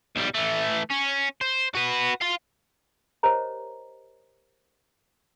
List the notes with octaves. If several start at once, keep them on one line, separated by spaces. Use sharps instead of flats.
B1 G3
E3 A3
C#4
C5
F#4 B4
F5 C6
G4 A#4 C5 C#5 D#5 A#5